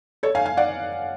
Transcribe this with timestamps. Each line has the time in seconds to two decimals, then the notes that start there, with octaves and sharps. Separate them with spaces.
0.23 A4 C#5
0.35 F5 G#5
0.46 F5 G#5
0.57 D5 F#5